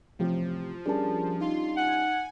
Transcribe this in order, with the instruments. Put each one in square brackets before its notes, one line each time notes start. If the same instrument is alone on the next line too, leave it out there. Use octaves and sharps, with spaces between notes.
[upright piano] A1 C3 G4 [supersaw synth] F3
[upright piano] G3 C#4 D4 [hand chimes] G#4 A#4 A5
[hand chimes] D#4 [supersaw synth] F4 C6
[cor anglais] F#5 [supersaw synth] G#5